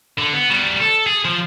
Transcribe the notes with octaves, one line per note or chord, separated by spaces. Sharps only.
D3
B3
G3 F#4
A4
G#4
F3